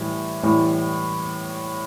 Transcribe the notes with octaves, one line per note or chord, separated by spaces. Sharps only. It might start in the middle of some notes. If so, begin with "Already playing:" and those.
Already playing: A2 E3 G3
A2 E3 G3